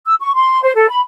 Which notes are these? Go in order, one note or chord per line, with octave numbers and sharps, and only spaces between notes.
E6
C#6
C6
C5
A4
B5